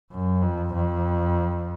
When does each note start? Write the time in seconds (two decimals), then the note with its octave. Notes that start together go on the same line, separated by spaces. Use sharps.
0.12 F#2
0.42 F2
0.74 F2